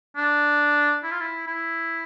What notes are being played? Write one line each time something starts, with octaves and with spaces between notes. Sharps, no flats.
D4
E4
F4
E4
E4